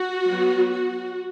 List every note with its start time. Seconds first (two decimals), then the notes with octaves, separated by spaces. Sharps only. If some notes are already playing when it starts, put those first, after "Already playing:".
Already playing: F#4
0.27 F#3 B3
0.72 F#4